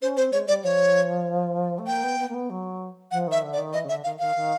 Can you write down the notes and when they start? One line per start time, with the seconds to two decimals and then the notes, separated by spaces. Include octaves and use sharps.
0.01 C#4 C5
0.17 C4 C5
0.32 G#3 C#5
0.48 G3 D5
0.64 F3 C#5
1.78 A3
1.87 A#3 G5
2.03 B3
2.18 B3
2.28 A#3
2.34 B3
2.49 F#3
3.11 F3 F#5
3.27 D#3 E5
3.42 D3
3.53 D5
3.58 D#3
3.73 E3 D#5
3.84 C#3
3.89 D3 E5
4.04 D#3 F5
4.19 D#3 F5
4.35 D#3